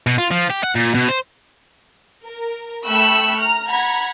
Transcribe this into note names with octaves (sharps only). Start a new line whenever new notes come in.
B2
F4
F3
G4
F#5
A#2
B2
C5
A#4
A3 G5 B5 C#6 E6 F#6
A#5 F6
F#5 A#5 B5 G#6